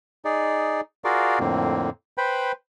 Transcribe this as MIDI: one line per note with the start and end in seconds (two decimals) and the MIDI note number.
0.25 0.81 63
0.25 0.81 68
0.25 0.81 74
1.04 1.39 65
1.04 1.39 66
1.04 1.39 68
1.04 1.39 70
1.04 1.39 74
1.04 1.39 77
1.40 1.90 41
1.40 1.90 45
1.40 1.90 50
1.40 1.90 58
1.40 1.90 60
2.18 2.52 71
2.18 2.52 72
2.18 2.52 79
2.18 2.52 83